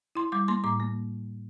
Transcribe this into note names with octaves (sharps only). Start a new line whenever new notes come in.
E4 C6
G3 D6
A#3 C6
A2 D6
A#3